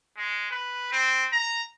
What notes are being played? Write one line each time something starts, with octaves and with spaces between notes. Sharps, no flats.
G#3
B4
C4
A#5